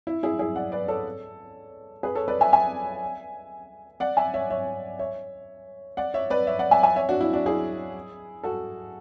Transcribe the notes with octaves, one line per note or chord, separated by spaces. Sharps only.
E4
E4 G#4
E4 G#4
D5 F#5
B4 D5
A4 C#5
G#4 B4
A4 C#5
B4 D5
E5 G#5
E5 G#5
D5 F#5
E5 G#5
C#5 E5
C#5 E5
C#5 E5
D5 F#5
C#5 E5
B4 D5
C#5 E5
D5 F#5
E5 G#5
E5 G#5
C#5 E5
D4 F#4
E4
D4 F#4
E4 G#4
F#4 A4